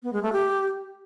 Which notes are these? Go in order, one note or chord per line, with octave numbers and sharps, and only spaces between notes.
B3
G#3
A3
G4